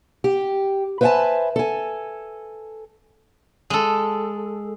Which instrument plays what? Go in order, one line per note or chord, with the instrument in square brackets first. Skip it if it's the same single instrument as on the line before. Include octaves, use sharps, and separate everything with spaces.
[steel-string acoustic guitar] G4
B4 C5 E5 F#5 G#5 A5
A4 G#5
[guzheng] G#3 A4